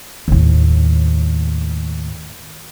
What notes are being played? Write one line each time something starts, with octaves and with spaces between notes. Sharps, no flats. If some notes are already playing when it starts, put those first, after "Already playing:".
D#2 A2